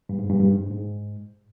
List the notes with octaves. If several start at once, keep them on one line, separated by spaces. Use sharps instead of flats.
G2
G#2
G2
G2
G#2
G#2